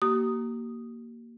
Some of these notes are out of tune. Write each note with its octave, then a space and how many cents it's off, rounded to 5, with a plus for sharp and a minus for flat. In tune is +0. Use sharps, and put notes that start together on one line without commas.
A#3 +0 G4 -40 D#6 +0